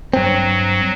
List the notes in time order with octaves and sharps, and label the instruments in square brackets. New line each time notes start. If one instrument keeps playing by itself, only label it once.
[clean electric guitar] G2 C4 [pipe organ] F#3